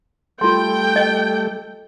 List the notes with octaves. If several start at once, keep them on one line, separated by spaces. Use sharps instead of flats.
G3 A3 F4 A4 G5 C6
D#5